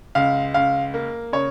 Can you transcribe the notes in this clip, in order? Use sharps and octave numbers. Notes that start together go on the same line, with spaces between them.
C#2 F5
C#2 F5
A#3
C#3 C#5